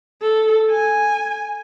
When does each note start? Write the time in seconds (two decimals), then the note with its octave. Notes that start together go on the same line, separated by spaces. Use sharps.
0.22 A4
0.71 G#5